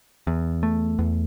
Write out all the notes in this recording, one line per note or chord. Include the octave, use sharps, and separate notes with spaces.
E2
A3
E2